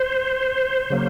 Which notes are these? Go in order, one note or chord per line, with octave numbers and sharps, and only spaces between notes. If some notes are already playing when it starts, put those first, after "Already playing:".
Already playing: C5
C#3 F#3 A#3